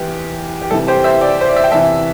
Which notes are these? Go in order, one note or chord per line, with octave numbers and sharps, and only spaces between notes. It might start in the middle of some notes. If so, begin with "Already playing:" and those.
Already playing: E2 E3 G4
G4
C2 C3 E3 A4
G4 C5
C5 E5
D5 G5
C5
D5
E5
G5
E2 C3 E3 E5 A5